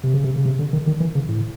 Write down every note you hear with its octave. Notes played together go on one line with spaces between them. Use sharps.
C3
C#3
C3
C#3
C3
D3
D#3
D#3
E3
C#3
A2